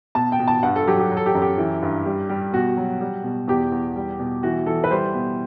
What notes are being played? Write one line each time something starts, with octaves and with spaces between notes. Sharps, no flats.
B2 A5
G5
B2
A5
G2 F#5
A4
F#3 G4
G4
F#3
A4
G4
F#2
G4
E3
G2
G3
G3
B2 F#4
F#3
G3
B2
E2 G4
E2
G3
B2
E3 F#4
E3 A4
B4
G3 C5
B2